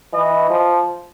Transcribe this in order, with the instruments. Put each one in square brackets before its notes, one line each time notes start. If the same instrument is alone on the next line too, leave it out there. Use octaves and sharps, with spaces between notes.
[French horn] E3 [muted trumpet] D#5
[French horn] F3